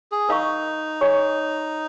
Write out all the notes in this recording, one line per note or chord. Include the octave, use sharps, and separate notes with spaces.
G#4
D#4 A#4 F5 A#5 C#6
G#4 C#5 G#5 C#6